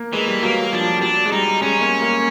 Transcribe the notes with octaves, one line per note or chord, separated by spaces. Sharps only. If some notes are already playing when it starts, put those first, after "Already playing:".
Already playing: A#3
E3 G#3
G3
F#3 A#3
F3 D4
G3
F#3 D4
G#3
G3 D#4
G#3 C#4
A#3
A#3